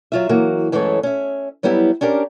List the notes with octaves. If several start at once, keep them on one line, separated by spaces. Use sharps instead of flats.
F#3 F4 E5
E3 F#3 A#3 F#4
F#2 E3 G#3 A3 A4 C#5
C#4 E5
F#3 G3 B3 E4 G4
C#4 D4 G4 A#4